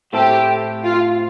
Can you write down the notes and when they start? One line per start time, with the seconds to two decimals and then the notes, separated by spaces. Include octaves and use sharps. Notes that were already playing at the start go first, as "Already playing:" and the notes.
0.13 A2 A3 C4 G4 A4
0.85 F4